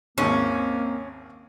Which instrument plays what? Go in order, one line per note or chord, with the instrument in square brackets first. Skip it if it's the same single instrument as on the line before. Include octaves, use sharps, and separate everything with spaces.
[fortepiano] G#1 D#2 G#2 [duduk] A#3 [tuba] C4 [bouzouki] C#4